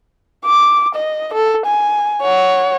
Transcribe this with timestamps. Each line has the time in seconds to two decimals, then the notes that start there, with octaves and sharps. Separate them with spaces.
0.45 D6
0.95 D#5
1.33 A4
1.66 G#5
2.22 C#5 F#5